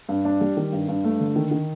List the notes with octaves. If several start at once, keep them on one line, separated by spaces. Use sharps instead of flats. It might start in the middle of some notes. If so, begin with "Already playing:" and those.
G2
D4
G3
D#3
G2
G2
A3
D3
D#3
D#3